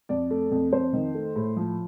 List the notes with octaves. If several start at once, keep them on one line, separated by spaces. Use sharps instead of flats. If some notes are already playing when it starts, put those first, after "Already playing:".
F2 D5
A3
F2
F2 C5
D#3
A3
A2
F3